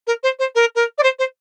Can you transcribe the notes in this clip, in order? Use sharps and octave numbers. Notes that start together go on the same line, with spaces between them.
A#4
C5
C5
A#4
A#4
D5
C5
C5